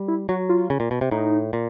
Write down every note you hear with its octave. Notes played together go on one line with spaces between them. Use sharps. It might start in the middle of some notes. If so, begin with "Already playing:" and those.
Already playing: G3
E4
F#3 F#4
F4
C#3
A#2
B2
C3
A2 D#4
A#2